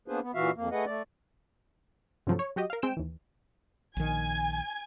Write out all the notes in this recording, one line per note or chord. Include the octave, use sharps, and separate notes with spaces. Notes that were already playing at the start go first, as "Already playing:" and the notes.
A#3 B3 D4 G#4 B4 C5
B3
A#2 E3 F#4 E5 F5
F2 A#3
A3 G#4 B4 D#5 F#5
A3 D5
G2 C3 F3 F#3 A3
C#5
F#3 F#4 G4 D#5
A#4 F5
G#3 C4 G5 D7 E7
D#2 E3
A#1 D#3 G#5 G#6